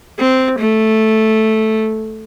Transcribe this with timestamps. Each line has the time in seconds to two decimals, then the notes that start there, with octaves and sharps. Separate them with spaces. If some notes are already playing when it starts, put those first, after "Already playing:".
0.19 C4
0.59 A3